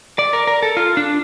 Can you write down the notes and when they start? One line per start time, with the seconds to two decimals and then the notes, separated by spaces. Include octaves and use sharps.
0.19 D5
0.33 A#4
0.47 A#4
0.62 A4
0.77 F4
0.97 D4